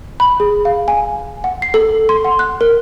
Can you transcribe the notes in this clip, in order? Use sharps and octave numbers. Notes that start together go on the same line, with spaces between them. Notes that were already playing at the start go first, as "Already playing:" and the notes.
B5
G#4
F5
G#5
F#5
C7
A4
C6
F#5
F#6
A#4